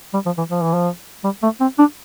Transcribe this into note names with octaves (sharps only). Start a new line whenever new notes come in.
G3
F3
E3
F3
E3
F3
G3
A3
C4
D4